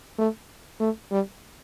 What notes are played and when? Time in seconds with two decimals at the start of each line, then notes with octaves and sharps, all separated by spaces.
0.18 A3
0.80 A3
1.11 G3